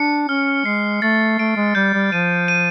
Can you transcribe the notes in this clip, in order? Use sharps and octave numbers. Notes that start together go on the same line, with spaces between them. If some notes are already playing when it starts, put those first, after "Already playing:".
Already playing: D4 C#7
C#4 F6
G#3 C7
A3 A6
A3 D7
G#3
G3 G6
G3
F3 D#7
D#7